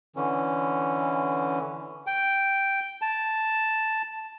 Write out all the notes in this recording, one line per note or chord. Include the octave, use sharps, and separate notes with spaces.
D3 E3 C#4
G5
A5